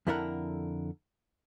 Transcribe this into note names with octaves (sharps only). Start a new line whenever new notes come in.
F2 D3 E4 A4 A#4 F#5